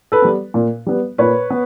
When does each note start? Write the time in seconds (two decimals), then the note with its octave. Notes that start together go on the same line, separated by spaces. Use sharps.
0.12 A4 B4
0.22 G3 B3
0.54 A#2
0.87 G3 B3
1.18 A#2 B4 C#5
1.50 B3